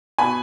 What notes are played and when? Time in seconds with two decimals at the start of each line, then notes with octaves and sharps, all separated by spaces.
0.18 B2 G#5 B5